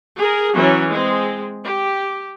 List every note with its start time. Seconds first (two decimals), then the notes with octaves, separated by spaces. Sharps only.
0.17 G#4 A#4
0.54 E3 F#3 C#4
0.90 G#3 C4
1.63 G4